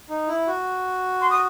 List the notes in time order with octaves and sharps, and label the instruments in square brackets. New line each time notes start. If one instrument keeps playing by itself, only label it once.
[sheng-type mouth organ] D#4
E4
F#4
[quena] C6
D#6